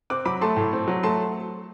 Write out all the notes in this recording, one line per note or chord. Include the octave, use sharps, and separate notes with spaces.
C4 D6 F#6
F#3 B5 D6
A3 A5 C6
A2
C4
F#3
A3 A5 C6